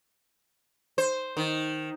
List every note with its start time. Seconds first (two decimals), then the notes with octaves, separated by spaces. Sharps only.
0.98 C5
1.37 D#3